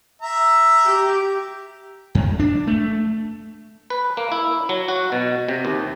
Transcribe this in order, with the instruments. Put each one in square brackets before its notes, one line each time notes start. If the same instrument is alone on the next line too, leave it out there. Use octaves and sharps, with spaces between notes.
[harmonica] E5 A#5
[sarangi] G4
[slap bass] F2
D4
A3
[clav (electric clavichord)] B4
A#3
E4
F#3
F#4
B2
C3
D#2